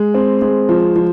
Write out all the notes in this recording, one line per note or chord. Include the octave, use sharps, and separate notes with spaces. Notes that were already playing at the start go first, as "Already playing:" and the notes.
Already playing: G#3
C4
G#3
F3
F3